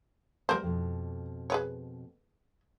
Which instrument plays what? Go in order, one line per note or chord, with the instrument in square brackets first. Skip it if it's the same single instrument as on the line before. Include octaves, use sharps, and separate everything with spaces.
[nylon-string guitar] G3 A#3 B3 [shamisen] A#4 C5
[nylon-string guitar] F2 B2
[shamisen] G#4 B4 C#5